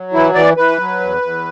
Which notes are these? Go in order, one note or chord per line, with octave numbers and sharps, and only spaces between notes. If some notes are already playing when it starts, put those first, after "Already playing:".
Already playing: F#3
E3 E4
E3 D5
E3 B4
F#3
E2
E2